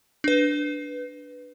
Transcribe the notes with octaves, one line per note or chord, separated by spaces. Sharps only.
D4 B4